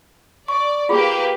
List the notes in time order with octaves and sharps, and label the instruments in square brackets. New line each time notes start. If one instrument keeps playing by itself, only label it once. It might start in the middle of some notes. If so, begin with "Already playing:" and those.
[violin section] D5 [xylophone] C#6
[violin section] A#3 G4 B4 [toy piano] F4 G#4